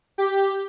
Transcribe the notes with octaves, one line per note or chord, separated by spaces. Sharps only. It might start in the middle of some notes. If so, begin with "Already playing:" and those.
G4